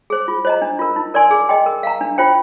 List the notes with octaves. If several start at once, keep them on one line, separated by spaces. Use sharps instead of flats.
G#4 C5
F4
C5 D#5 A#5
D4
F4 A#4
D#4
A#4 D5 G#5 C6
G#4
D#5 G5 C6
A#4
F5 A#5
D4
F4 C5 G5